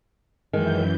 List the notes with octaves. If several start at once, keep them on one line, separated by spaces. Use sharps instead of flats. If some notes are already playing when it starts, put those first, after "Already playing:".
F#2 D#3 E3 G#3 G6